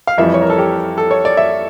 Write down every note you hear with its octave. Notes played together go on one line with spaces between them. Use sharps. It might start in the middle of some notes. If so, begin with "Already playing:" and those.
F5
F2 E3 G3 E5
C#5
A#4
A4
G4
A4
C#5
D5
E5